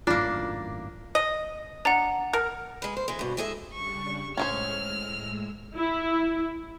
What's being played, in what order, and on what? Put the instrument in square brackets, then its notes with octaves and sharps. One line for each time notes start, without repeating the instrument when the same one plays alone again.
[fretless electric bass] G#1 F#2 A2 [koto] A#3 D4 [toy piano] F4
[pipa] D#5
[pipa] D4 [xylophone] F#5 A#5
[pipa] A#4
[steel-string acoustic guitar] G#3 B4
C5
E3 G#3
G2 B2
E3 G#3 G#4 A4 D#5 E5
[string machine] C#3 G3 D4 [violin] C#6
[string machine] A2 G#3 E6 [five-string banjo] C#4 G#4 C5 [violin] F6
[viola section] E4